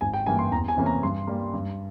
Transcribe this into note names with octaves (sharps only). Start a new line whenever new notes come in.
G#1 G#5
G5
G2 E3 A#3 G#5
C6
E2 A#5
G#5
C3 E3 A#3 C#4
A#5
G2 C6
G3 A#3
G2